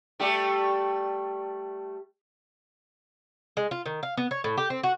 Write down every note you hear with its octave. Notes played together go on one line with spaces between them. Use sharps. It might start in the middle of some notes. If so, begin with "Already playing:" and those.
G3 A3 G4
G#3
F4
D#3
F5
B3
C#5
A2
G4
C4
F#4